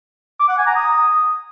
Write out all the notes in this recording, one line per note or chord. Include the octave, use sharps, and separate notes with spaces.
D6
F#5
G#5
A#5
D#6